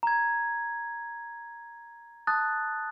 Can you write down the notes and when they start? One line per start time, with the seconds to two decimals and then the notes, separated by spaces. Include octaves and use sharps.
0.03 A#5 G#6
2.27 A5 D#6 F#6 A6